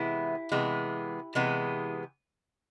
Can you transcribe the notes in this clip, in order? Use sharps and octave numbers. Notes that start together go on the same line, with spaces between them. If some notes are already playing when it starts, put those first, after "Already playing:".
Already playing: C3 E3 G#3 B3 E4
C3 E3 G#3 B3
C3 E3 G#3 B3